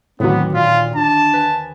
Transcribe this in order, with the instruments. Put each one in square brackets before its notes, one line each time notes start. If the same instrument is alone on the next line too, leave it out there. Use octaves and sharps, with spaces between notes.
[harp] D#2 D3 D#3 [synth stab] A2 F#3 [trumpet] B3 [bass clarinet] C4
[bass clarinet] A#2 [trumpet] F4 [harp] B6
[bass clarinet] D4 [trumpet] A5
[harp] B4 G#5